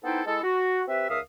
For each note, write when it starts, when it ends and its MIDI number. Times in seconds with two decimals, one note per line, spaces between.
0.04 0.22 59
0.04 0.22 63
0.04 0.22 64
0.04 0.22 69
0.04 0.22 72
0.04 0.22 79
0.26 0.42 56
0.26 0.42 64
0.26 0.42 68
0.26 0.42 69
0.44 0.82 66
0.88 1.07 60
0.88 1.07 67
0.88 1.07 71
0.88 1.07 76
1.10 1.20 37
1.10 1.20 70
1.10 1.20 76
1.10 1.20 77
1.10 1.20 87